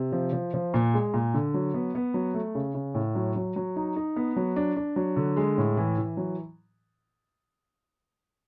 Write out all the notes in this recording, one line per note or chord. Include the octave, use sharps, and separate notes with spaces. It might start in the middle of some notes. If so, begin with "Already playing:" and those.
Already playing: C3
F3
F3
F3
A#2
G#3
A#2
D3
F#3
B3
B3
F#3
A3
C#3
C#3
A2
F#3
F#3
F#3
D#4
D#4
B3
F#3
D4
D4
F#3
D3
G#3
A2
E3
E3
F#3